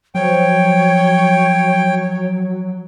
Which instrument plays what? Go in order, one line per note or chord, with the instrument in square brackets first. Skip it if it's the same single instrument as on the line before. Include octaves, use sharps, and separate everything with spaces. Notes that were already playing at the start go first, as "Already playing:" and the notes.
[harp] F3 [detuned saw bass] F#3 [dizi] C#5 [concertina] G5